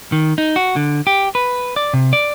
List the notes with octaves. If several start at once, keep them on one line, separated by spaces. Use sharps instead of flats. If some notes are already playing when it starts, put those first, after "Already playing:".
D#3
D#4
F#4
D3
G4
B4
D5
C3
D5